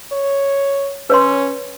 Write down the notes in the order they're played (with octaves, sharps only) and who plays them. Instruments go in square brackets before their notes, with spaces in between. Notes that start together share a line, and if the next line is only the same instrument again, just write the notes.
[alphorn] C#5
[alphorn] C#4 [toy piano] B4 C#5 C6